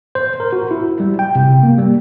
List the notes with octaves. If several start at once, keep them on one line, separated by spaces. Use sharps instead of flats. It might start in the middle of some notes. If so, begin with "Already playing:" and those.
C5
A#4
F#4
E4
G3
G5
C3
A#3
G3